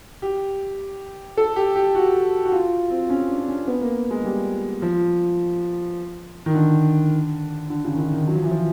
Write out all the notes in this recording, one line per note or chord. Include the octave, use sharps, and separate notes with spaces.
G4
A4
G4
G4
F#4
F#4
F4
C4
C#4
D4
D4
C#4
B3
A#3
G#3
G3
F3
D#3
D3
D3
C#3
D#3
D3
D#3
F#3
F3
E3
F3